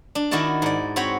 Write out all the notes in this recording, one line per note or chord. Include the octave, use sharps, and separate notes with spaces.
D4
D#3 E4 F#4 D5 A5
G#2 D5
C4 F#4 C#5 B5